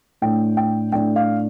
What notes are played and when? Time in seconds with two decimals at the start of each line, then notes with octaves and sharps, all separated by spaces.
0.22 A2 A3 D4 G5
0.57 G5
0.92 A2 A3 D4 G5
1.16 F5